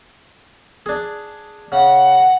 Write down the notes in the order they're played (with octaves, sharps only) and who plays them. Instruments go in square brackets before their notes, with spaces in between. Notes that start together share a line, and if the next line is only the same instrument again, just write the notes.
[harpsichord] D4 G#4
[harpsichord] C#3 [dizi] F#5